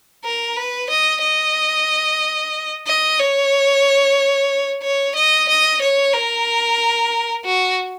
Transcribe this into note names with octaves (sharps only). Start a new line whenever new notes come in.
A#4
B4
D#5
D#5
D#5
C#5
C#5
D#5
D#5
C#5
A#4
F#4